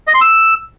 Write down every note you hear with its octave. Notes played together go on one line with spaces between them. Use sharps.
D#5
C6
E6